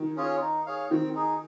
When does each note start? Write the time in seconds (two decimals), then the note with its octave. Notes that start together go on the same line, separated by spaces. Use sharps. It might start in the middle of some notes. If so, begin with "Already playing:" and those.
Already playing: D#3
0.16 C#4 F4 G#4 C#5
0.41 D#4
0.66 G#4 C#5 F5
0.90 D#3 C4
1.15 D#4 G#4